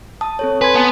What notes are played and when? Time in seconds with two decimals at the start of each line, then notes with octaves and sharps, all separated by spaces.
0.21 A5 D#6
0.39 C4 A4 C#5
0.61 B4 G#5 C6 G#6
0.75 B3 G#5 A5